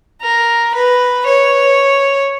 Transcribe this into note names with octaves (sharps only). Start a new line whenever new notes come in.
A#4
B4
C#5